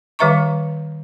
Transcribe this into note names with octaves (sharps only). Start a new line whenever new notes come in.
D#3 G3 B4 E5 A#5 C#6